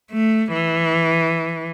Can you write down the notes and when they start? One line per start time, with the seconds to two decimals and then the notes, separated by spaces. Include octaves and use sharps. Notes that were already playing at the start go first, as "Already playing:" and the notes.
0.12 A3
0.54 E3